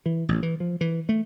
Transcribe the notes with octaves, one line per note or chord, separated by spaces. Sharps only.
E3
A1
E3
F3
E3
A3